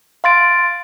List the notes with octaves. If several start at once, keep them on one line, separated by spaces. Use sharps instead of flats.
F5 C6 A6 D7